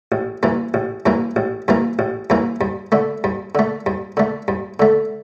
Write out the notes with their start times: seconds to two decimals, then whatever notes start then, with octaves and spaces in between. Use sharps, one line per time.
0.12 A1
0.43 G2 E3 A#3
0.74 A1
1.06 G2 E3 A#3
1.36 A1
1.68 G2 E3 A#3
1.99 A1
2.30 G2 E3 A#3
2.61 G2
2.92 D3 A3
3.24 G2
3.55 D3 A3
3.86 G2
4.17 D3 A3
4.48 G2
4.80 D3 A3